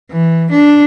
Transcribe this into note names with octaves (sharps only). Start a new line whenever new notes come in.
E3
D4